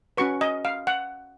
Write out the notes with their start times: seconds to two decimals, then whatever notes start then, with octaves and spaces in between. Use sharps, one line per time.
0.17 C#4 F#4 B4 C#6
0.41 D#5
0.65 F5
0.87 F#5